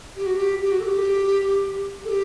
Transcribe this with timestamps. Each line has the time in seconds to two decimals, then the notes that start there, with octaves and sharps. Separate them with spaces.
0.16 G4
0.26 F#4
0.36 G4
0.63 G4
0.71 F#4
0.80 A4
0.84 G4
2.05 A4
2.09 G4